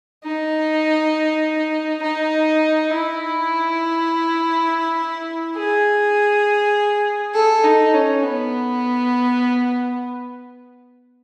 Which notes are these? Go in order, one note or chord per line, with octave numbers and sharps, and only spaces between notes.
D#4
D#4
E4
G#4
A4
D#4
C#4
B3